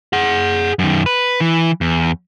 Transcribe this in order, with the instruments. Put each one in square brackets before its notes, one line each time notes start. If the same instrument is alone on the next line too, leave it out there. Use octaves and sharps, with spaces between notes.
[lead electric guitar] G#4 F#5
F#2 D#3
B4
E3
E2